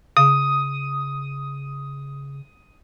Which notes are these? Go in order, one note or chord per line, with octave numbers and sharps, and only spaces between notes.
C#3 D#6